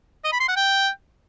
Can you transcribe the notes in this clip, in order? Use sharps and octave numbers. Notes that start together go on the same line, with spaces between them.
D#5
B5
C6
F#5
G5